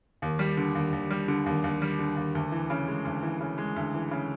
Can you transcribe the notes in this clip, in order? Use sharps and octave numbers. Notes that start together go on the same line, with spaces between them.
D#2
G3
D3
D#2
D#2
G3
D3
D#2
D#2
G3
D3
D#2
D2
E3
C#3
G#3
D2
E3
C#3
G#3
D2
E3
C#3